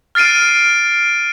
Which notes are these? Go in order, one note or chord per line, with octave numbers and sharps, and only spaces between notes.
F6 A6 C7 D7 D#7